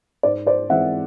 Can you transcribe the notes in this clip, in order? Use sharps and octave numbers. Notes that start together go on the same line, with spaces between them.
G#2 C5 D5
C5 D5
E3 G#3 C4 E5 F#5